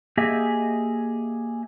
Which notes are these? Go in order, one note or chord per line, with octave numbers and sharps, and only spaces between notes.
A#3 G4 G#4 D#5 E5